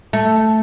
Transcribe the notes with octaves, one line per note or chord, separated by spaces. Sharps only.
A3